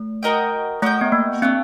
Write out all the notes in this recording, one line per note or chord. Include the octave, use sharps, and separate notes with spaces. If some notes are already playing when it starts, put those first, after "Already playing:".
Already playing: A3
F#4 A#4 D#5 G5
A3 F#4 A#4 D#5 G5
B3
A#3
A3 C4 D4 G4